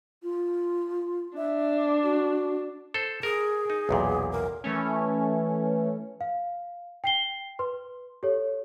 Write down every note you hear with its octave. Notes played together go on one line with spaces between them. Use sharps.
F4
D4 E5
F#4
A4 C5
G#4 A#4
D#4
B1 E2 A#2
A#4
E3 A3 C#4
F5
G5 C7 G7
B4 C6
G4 A4 C#5